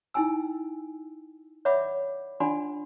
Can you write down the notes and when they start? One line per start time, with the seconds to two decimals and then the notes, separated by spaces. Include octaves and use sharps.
0.14 D#4 E4 G5 G#5 E6
1.65 C#5 D5 E5 F#5 B5 D6
2.40 D4 F4 D5 F#5 G#5 C6